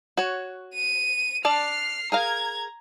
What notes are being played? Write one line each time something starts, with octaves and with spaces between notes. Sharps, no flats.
F#4 C#5
D#7
D4 D5 A5 F6 C7
G#4 A#4 F5 A#5 G#6